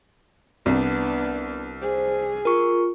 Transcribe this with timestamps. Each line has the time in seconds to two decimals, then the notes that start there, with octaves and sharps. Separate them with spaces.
0.66 C2 B3 D4
1.82 G#4 C5
2.45 F4 A#4 C#6